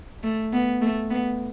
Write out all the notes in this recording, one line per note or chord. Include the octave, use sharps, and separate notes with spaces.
A3
B3
A3
B3